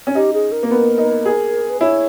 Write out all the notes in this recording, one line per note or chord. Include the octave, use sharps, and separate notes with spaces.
C#4
D#4 G4
G#4
A#4
A#3
B3
D#4
G#4
B4
E4 C#5